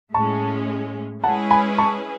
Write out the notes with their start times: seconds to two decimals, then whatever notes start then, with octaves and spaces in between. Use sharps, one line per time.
0.14 A2 G#3 C#4 A5 C#6
1.23 G#3 C#4 E4 G#4 B4 F#5 A5
1.51 G#5 B5
1.78 A5 C#6